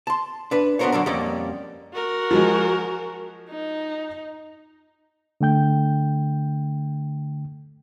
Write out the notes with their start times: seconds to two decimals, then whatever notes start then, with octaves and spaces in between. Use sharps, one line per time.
0.07 A5 C6
0.51 D4 B4
0.79 B3 D4 F#4 A#4 C5 C#5
0.92 D3 F#3 D4 A#4
1.06 F2 F3 G3 A#3 C#4 D5
1.93 F#4 A#4
2.31 F3 F#3 G#3
3.49 D#4
5.41 D3 A3 G5 G6